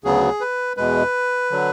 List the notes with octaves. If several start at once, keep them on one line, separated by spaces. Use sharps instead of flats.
D2 C#3 F#3 B3 G#4
B4
E2 B2 G#3 B4
D3 F#3